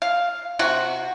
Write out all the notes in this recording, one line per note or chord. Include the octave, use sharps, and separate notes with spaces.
F5
C3 F#4